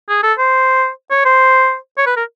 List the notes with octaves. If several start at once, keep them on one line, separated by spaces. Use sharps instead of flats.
G#4
A4
C5
C#5
C5
C#5
B4
A#4